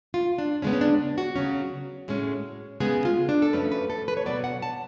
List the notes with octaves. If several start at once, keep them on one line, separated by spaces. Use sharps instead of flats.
F4
D4
C#3 G#3 B3 C#4
C#4
D4
F#4
C#3 F#3 C#4
A2 G#3 C#4
C#3 G#3 B3 G#4
F4
D4
A4
F#2 F3 A3 C#4 B4
B4
A4
B4
C#5
B2 F#3 B3 D5
F#5
A5